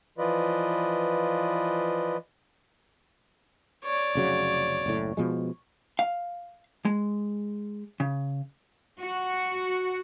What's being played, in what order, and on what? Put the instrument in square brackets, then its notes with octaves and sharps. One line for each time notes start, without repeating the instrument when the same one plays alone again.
[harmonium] E3 F3 F4 B4 D5 D#5
[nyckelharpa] C#5 D5
[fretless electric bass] F1 C#3 F#3
F#1 A2
B2 F3 G#3
[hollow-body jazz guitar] F5
G#3
C#3
[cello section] F#4